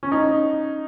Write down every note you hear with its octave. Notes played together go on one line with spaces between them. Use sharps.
C#4
D#4